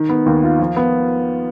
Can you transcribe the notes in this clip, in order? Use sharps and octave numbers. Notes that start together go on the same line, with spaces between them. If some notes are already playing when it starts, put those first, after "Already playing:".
Already playing: D#3
B3
D#2
F4
F3
B3